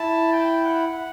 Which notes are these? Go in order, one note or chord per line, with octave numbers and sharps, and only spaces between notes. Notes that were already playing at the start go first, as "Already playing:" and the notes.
Already playing: E4 A5
G5
F#5